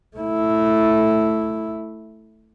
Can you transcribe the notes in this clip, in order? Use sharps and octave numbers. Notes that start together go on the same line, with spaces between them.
A3 E4